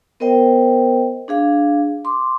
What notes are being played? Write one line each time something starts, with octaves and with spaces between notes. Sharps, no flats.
B3 A#4 C5 D#5 G5
D4 G#4 F5
C6 D6